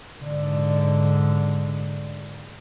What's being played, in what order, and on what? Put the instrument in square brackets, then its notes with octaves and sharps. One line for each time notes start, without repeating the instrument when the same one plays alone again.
[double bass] G#2 D3